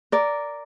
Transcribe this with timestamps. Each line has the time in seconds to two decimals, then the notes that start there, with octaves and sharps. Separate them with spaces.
0.12 A#4 D5